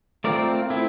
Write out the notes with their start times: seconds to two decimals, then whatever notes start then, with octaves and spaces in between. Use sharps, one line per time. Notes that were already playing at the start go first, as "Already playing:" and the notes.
0.24 A3 C4 F4 A#4 D5
0.70 A3 C4 E4